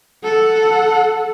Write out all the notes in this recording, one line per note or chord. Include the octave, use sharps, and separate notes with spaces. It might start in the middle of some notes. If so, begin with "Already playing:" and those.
A4 F#5